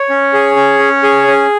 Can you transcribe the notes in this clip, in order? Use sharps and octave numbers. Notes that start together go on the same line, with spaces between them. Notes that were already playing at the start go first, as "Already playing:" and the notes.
Already playing: C#5
C#4
G#4
C#4
C#4
G#4
C#4